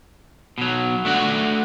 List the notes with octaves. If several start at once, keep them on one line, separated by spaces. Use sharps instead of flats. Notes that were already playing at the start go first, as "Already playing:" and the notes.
B2 F#3
A3 D4 F#4 F#5